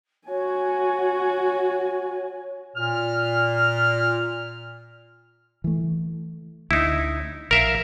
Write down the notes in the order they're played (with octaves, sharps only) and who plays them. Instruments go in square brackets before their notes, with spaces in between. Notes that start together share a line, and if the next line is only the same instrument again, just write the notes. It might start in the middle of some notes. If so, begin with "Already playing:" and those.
[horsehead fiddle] F#4 G#5 [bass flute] C#5
[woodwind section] A#2 F6
[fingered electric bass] E3 A3
[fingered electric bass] D2 [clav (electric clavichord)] D#4 E4
[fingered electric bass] A#1 [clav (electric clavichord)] A#4 E5 F5